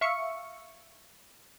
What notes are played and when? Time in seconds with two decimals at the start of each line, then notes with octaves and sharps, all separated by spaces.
0.01 E5 F5 C#6 C#7